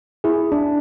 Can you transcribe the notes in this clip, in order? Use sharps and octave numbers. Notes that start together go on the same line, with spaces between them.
E4 G#4
D4